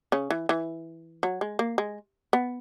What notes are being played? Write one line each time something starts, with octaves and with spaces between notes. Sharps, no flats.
C#3 C#4
E3
E3
F#3
G#3
A#3
G#3
B3